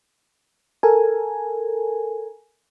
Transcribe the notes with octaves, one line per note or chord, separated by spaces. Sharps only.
A4 A#4 G#5